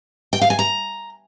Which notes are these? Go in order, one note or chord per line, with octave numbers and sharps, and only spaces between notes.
G5
F5
G#5
A#5